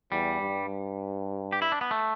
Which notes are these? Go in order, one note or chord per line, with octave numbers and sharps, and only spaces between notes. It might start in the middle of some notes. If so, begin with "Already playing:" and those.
E2 G3
G2
G4
E4
D4
B3
A3